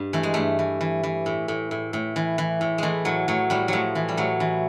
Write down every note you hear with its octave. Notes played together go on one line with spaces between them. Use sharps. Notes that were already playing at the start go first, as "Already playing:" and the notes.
Already playing: G2
E3 A3
G#3
G2 A3
E3
E3
E3
A2
A2
A2
A2
E3
E3
A2
E3 G#3 A3
A2 F#3
A2 F#3
A2 G3
A2 F3 F#3
E3
G3
A2 F#3
E3